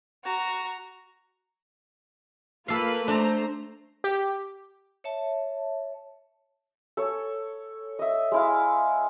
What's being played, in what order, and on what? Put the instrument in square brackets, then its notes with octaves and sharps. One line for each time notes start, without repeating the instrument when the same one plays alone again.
[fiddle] F#4 A#5
[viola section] A#3 F4 B4 [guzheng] A4 F5
[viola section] A3 C5 A#5 [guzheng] D4
[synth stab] G4
[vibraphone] C#5 E5 A5
[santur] A4 C#5
D#5 E5
G#3 E4 F5